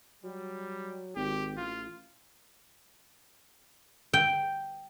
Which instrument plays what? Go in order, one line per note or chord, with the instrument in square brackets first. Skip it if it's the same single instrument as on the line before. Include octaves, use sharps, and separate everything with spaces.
[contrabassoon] F#3 [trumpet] G3
[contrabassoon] G#1 [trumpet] G4
[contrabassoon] A1 [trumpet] F4
[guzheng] G5